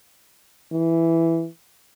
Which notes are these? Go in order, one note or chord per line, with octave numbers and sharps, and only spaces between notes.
E3